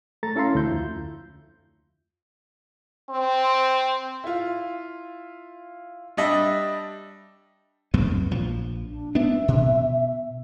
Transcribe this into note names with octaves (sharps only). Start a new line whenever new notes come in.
A3 A4 A#5 A6
C#4 E4 A4 F5 A#5 C6
D2 E4 G6
F2 F4
C4
E4 F4
G3 D4 D#5 E5
B1 F2 B3
A#1 F3
D4
B3 D4 E5
B2